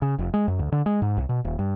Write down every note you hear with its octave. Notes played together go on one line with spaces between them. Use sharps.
C#3
F1
G#3
F#2
D2
D3
G#3
G#2
C2
B2
D#1
G2